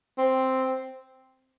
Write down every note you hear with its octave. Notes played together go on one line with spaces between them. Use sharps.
C4